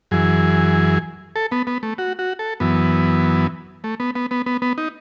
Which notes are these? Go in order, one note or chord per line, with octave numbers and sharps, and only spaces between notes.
F#2 E3 G#4
A4
B3
B3
A3
F#4
F#4
A4
F#2 E3 B3
A3
B3
B3
B3
B3
B3
D#4